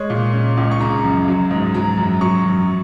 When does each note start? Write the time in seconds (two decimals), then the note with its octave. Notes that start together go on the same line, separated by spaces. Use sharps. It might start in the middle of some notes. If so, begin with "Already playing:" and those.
Already playing: G#3 C#5
0.10 A#2
0.33 C#3
0.57 C#2
0.71 C#6
0.80 C#3 A#5
1.04 F#2
1.28 F#3
1.51 G#2
1.74 F#3 A#5
1.98 F#2
2.21 F#3 C#6
2.45 F#2